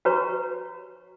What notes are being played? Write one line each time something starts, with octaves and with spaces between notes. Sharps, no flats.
F#4 G4 B4 C#5 A#5 C#6